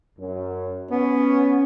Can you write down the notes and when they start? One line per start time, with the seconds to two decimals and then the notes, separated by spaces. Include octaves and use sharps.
0.19 F#2
0.91 B3 C#4